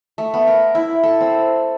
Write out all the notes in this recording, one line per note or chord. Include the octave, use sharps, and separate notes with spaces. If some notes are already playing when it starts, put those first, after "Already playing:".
A3
B3
A#4
E4
A4
C4